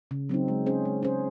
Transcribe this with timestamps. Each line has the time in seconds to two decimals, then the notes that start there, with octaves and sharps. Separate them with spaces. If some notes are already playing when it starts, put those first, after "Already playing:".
0.11 C#3
0.29 F#3 C4 D#4
0.48 G#3
0.66 C#4 G#4 C5
0.85 G#3
1.03 C#4 G#4 C5